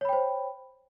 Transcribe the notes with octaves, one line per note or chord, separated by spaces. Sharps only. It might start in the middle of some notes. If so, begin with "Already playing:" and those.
C5 C#5 G5 B5